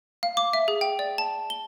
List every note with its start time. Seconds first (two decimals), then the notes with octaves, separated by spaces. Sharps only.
0.23 F5
0.37 D6
0.53 E5
0.68 G#4
0.81 G5
0.99 D5
1.18 A5
1.50 G7